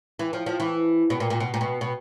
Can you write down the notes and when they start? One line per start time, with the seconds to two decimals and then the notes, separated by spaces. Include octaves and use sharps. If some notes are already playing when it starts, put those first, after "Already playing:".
0.19 E3
0.33 F3
0.46 F3
0.60 E3
1.10 B2
1.20 A#2
1.30 A#2
1.40 B2
1.54 A#2
1.61 B2
1.81 B2